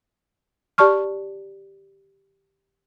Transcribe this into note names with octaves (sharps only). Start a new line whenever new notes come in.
G4 D5 A5 C#6 F6